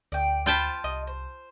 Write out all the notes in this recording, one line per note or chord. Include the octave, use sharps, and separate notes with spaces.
D2 D5 G5
F4 C5 G5 A5 B5
C2 D#5
C5